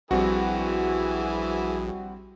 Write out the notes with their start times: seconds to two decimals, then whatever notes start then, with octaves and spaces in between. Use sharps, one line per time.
0.11 A#1 E3 G3 C4 E4 F#4 G#4